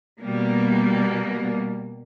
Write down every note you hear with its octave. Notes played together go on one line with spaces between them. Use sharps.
B2 G3 A#3